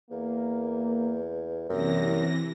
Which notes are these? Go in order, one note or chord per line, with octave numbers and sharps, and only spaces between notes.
E2 A#3
F#2 C3 E3 G3 A#3 E4 A#6